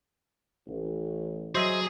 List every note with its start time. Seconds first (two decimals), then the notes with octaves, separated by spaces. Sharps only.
0.68 A1
1.55 F#3 F#4 G#4 C5 D#5 E5 G#5